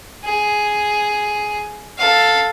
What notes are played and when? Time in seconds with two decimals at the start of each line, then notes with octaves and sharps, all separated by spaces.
0.24 G#4
1.98 A4 F5